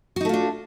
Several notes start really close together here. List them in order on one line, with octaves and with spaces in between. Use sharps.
F#4 D#4 A3 F4 D4